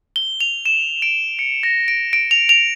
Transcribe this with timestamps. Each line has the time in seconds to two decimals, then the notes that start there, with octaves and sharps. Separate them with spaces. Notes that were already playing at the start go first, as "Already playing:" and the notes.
0.16 G7
0.41 F7
0.66 E7
1.02 D7
1.39 C#7
1.63 A#6
1.88 D7
2.13 D7
2.31 F7
2.49 F7